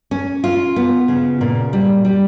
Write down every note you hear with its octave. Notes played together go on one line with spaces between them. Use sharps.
C#4
F4
B3
C#3
A#2
G3
G3